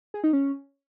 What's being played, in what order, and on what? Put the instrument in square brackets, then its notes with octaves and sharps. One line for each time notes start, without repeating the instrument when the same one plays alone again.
[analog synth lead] G#4
D#4
C#4